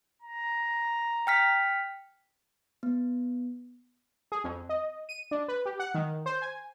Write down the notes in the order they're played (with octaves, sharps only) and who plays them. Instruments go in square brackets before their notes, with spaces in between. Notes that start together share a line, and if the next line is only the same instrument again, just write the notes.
[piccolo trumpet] A#5
[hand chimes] G5 F6 B6
B3
[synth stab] G#4
F2
D#5
D#7
D4
B4
G4
F#5
D#3
C5
G#5